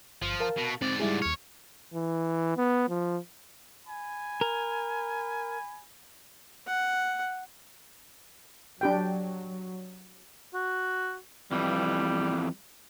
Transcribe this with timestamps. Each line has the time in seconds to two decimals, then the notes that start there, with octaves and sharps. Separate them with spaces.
0.22 G1 F3
0.40 A#4 F5 A5
0.57 B2
0.81 G#2 C4 D5
1.00 G3 E4 G#4
1.22 D#2 C#5 F6
1.94 E3
2.57 B3
2.89 F3
3.87 G#5 B5
4.41 A#4
6.67 F#5
8.81 F#3 D4 G4 G5
10.54 F#4
11.52 F2 E3 G3